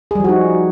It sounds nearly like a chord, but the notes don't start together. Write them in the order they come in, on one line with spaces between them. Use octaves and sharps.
G#4 G3 F3 F#4 D#4